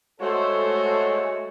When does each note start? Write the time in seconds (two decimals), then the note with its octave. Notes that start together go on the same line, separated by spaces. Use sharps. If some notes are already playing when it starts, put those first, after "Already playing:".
0.21 G#3 A3 F#4 A4 C5 C#5